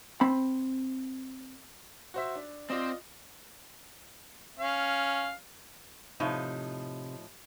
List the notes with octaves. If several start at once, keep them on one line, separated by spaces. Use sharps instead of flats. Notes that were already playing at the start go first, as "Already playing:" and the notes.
C4 B5
F#4 C5 E5
D4
C4 F4 C5 D5 D#5
C#4 F5
A2 C3 F3 D#4